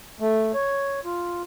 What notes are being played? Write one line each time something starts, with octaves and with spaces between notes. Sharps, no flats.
A3
C#5
F4